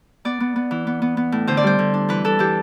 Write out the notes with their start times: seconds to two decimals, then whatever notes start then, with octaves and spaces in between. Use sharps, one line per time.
0.25 B3 D5
0.40 B3
0.56 B3
0.71 E3
0.87 B3
1.02 B3
1.17 B3
1.32 A2
1.47 D3 C5
1.57 D5
1.63 G3 C5
1.79 D3
1.94 D4
2.09 E3 B4
2.24 E3 A4
2.39 E3 G4